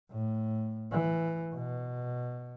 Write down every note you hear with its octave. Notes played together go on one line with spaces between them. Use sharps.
A2
E3
B2